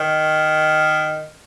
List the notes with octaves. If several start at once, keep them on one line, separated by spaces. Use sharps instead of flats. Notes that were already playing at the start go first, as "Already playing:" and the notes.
Already playing: D#3